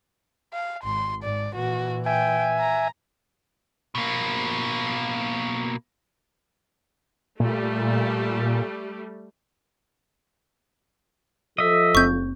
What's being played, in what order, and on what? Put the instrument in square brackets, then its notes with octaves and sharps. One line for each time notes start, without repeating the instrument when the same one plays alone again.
[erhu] F5
[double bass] G#1 [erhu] C6
[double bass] G#2 [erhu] D5
[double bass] A#2 E3 [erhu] F#4
[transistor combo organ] E5 G#5 [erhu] G5
[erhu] A#5
[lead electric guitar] B2 A#3
[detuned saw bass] A#2 [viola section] G3 A3
[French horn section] F3 A4 [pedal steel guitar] D#5 E5
[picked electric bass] F#1 C4 [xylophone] C#6 G6